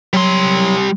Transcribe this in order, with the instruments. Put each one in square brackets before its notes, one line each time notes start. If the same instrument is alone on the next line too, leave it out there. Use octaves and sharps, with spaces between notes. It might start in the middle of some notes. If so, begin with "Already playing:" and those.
[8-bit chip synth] F#3 [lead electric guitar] G3 C6